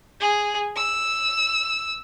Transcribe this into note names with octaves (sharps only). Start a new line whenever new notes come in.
G#4
E6